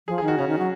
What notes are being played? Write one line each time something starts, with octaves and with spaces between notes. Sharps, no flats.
F3 G#4
G#4
D#3 F#4
C#3 C#4
D#3
F#3